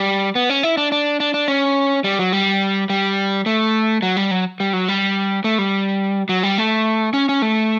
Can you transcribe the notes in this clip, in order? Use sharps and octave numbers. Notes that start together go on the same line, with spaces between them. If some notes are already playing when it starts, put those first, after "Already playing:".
Already playing: G3
B3
C#4
E4
D4
D4
D4
D4
C#4
G3
F#3
G3
G3
A3
F#3
G3
F#3
G3
F#3
G3
A3
G3
F#3
G3
A3
C#4
C#4
A3